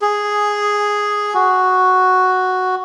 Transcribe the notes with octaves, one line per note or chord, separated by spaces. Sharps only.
G#4
F#4